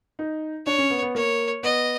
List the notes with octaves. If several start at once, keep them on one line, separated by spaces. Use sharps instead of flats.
D#4
D4 C#5
C#4
B3
B3
A#3 C#5
B3 D#5